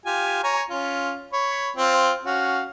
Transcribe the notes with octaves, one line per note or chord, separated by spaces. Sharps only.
F4 G4 G#5
C#5 G#5 A#5
C#4 F4
C#5 B5
C4 F4
C#4 F#4 F5